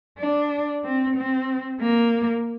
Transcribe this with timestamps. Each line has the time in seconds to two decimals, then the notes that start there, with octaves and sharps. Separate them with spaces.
0.18 D4
0.84 C4
1.16 C4
1.81 A#3